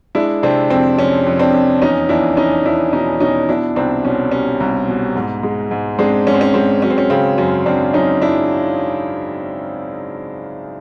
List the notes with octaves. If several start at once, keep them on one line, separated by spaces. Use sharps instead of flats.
G#3 D4 E4
C3 C4 D4
F2 C4
F2 C#4
F2
C4 D4
F2
E2 C#4 D#4
E2 D4 E4
E2 C#4 D#4
E2 D4 E4
B2 C#4 D#4
B2 C#4 D#4
B2 D4 E4
C2 C4 D4
B2 C#4
G3 C#4
C2
B2
G#2
G#3
G#2
G#3 C4 D4
G#2 C#4
C4
C#4
G#3 C4
F#3 C#4
C4
C#4
C#3 C4
F#2 C#4
F#2 C4 D4
F#2 C#4 D#4
F#2 D4 E4